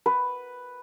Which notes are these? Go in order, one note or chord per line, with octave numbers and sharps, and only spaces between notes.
B4